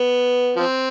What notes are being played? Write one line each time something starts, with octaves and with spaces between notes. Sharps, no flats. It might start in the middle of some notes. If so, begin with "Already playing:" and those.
Already playing: B3
F3 C4